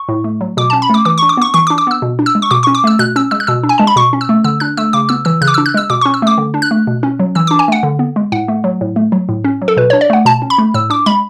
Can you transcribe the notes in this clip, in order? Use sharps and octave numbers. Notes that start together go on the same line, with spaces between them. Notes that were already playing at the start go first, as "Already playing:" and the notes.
Already playing: C#6
A2
A3
F#3
B2 D6
C#4 A5
B5
A3 D6
E3 D6
D4 C#6
D6
B3 C#6
E3 C#6
D6
D4
D6
B3 E6
B2
D4
E6
G#3
C#6
B2 D6
C#4 C#6
D6
A3 E6
B2 F#6
C#4 E6
G#3 E6
F#6
B2 E6
D4
G#5
G#3 A5
B5
B2 C#6
C#4
E6
A3
D3 E6
D4 F#6
A3 E6
C#3 D6
B3 E6
E3 E6
C#3 F#6
D6
D4 E6
F#6
G#3 E6
B2 D6
C#4 C#6
E6
A3 D6
D3
D4
F#6
A3
B2
C#4
F#3
E3 E6
D4 D6
G#5
A3 F#5
D3
B3
G#3
A2 F#5
A3
F#3
A2
A3
F#3
A2
C#4
F#3
A4
B2 B4
D4 C#5
D5
A3 F#5
B2 A5
C#4
B5
A3
A2 E6
D4 D6
G#3 B5